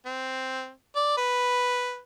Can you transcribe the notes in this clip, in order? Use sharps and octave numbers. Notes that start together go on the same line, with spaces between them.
C4
D5
B4